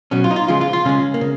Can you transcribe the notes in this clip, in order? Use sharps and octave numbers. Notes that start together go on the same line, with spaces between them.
B2 F#3 C#4
F4
D#4
F4
C#3 F3 G#3 F4
F4
F4
C#3 G#3 C#4
A#3
C#3